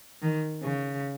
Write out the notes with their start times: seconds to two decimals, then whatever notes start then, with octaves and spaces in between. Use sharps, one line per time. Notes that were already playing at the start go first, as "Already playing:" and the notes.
0.22 D#3
0.63 C#3